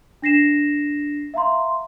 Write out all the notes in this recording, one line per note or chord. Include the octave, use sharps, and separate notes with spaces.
D4 A#6 C7 E7
E5 F5 A#5 C6